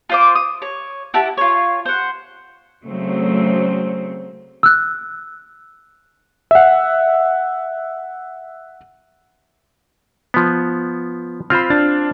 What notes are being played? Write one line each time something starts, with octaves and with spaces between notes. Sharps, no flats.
F4 C5 D6
D#6
C#5
E4 G4 F#5 A5
F4 C#5
C5 F#5
C#3 F#3 A3 C4
E6 F#6
E5 F#5
F3 B3
C4 F4 C5 B5 F6
D4 A6